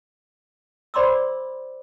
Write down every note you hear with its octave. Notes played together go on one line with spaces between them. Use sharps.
C5 D5 B5 C6 D6 E6